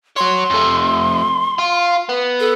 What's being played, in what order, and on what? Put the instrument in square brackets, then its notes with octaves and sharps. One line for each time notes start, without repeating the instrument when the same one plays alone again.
[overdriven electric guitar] F#4 C#5 [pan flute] C6
[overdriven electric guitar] F2 A3
F4
B3
[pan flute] A4